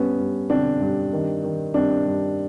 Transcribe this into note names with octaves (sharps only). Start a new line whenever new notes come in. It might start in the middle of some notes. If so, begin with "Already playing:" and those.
Already playing: G2 B3 C#4
G2
D3 C4 D4
G2
D#3
D#3
G2 C4 D4
G2